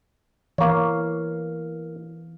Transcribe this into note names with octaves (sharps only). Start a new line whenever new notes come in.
E3 A#3 C#5 F5